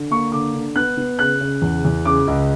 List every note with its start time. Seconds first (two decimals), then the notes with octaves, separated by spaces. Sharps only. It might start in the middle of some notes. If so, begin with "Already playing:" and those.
Already playing: D3
0.11 A#3 C#6
0.32 D3 D6
0.54 D3
0.76 B3 F#6
0.97 B3
1.19 C#3 F#6
1.41 C#3
1.62 E2
1.85 E2
2.05 C#3 D6
2.28 C#2